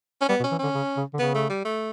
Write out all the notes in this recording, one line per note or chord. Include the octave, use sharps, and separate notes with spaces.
C#4
G3 B3
B2
C#4
E3
D3 C#4
C#3
C#3
D3
C#3 B3
A3
G3
A3